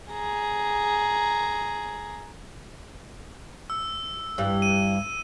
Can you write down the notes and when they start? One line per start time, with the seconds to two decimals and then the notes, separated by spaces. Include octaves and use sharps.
0.12 G#4 A#5
3.70 E6
4.38 G2 E3 G3
4.62 D#7